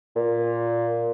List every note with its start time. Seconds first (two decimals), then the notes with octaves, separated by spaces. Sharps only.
0.16 A#2